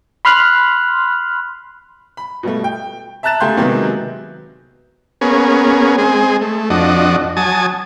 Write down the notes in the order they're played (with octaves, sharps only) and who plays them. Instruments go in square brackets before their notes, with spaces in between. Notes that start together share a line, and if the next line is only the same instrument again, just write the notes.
[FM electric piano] B5 C6 F6 F#6
[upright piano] B5
B2 G3 A3
G5
E5 A5 A#5 F#6 A6 E7
C#3 A3 G4 F5 C6 G6
C3 D#3 F#3 G#3 A#3 B3
[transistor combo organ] A#3 B3 C#4 G#4
G#3 C4 G#4
A3
F2 D4 F#4 D#5
F#3 G#5 A5 D#6